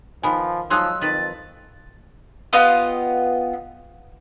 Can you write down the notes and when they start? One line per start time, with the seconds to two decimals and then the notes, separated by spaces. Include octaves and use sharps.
0.23 D#3 F3 B3 G#5 B5
0.70 F3 F#3 G#3 D#4 C6 E6 F#6
1.01 F2 D#3 B4 A6
2.53 B3 F4 G4 D#5